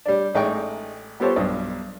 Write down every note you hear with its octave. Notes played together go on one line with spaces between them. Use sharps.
G3 D4
A1 G#3 D#4 G5 C#6
B3 F4 G4 A4 C5 C#5
B1 G2